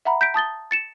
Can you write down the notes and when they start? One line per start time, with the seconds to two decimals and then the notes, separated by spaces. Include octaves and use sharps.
0.05 E5 F#5 A#5 B5
0.21 G6 B6 D7
0.34 A5 D#6 A6 G7
0.71 A6 C#7 E7